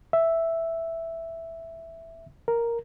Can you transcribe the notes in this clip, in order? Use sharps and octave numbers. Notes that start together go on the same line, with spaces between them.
E5
A#4